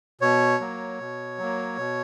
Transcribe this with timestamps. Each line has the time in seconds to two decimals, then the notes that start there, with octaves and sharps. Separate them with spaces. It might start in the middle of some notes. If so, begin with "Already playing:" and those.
0.21 B2 C#5
0.60 F#3 A#3
1.00 B2
1.38 F#3 A#3
1.78 B2